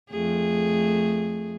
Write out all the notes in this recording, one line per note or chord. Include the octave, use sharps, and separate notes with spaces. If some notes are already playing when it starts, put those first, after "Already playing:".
F2 A3 G#4